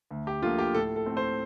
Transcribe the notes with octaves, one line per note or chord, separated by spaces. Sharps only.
D2
G4
D3 F3 A#3 F4
G4
A2 A4
A4
A3 C4
C5